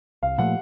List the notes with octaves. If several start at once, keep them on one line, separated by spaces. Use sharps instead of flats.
C2 F5
A#2 F3 A3 F#5